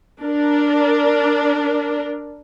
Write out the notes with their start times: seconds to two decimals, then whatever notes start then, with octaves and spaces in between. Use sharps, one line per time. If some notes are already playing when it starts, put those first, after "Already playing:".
0.21 D4 A#4